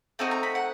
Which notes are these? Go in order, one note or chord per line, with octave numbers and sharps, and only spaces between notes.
A3 C4 D#4 F#4
A#5
B5
F#5